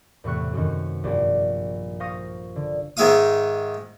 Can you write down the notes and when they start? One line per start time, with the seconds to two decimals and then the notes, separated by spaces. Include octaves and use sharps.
0.24 E2 A2 C3 C#6 F#6
0.53 F#2 C3 D#3
1.04 A#1 G2 D5
2.00 C5 F5 C#6 D#6 A#6
2.56 D3
2.97 G#2 D#3 G#3 E5 F5 D#6